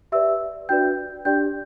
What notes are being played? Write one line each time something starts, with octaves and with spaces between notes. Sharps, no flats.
G4 B4 D5 E5 E6
D4 F#4 B4 D5 G5 G6
D4 G4 D5 G5 G6